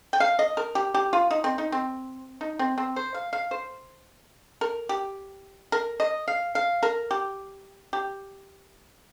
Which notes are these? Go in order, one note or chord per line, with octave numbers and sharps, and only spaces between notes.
G5
F5
D#5
A#4
G4
G4
F4
D#4
C4
D#4
C4
D#4
C4
C4
C5
F5
F5
C5
A#4
G4
A#4
D#5
F5
F5
A#4
G4
G4